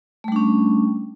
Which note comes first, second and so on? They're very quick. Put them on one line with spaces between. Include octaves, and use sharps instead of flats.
A3 G3 D4 C#4